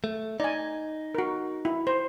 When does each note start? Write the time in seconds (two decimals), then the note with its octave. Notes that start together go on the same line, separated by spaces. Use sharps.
0.04 A3
0.40 D#4 D5 G#5
1.15 F#4 A#4
1.65 E4
1.87 C5